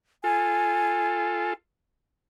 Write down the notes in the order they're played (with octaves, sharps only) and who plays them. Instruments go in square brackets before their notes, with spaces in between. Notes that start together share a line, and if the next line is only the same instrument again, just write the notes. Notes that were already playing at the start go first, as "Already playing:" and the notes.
[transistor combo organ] F4 A4 [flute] G#5